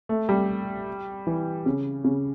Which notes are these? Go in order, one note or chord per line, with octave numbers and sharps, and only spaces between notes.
A3
G3
E3
C#3
C#3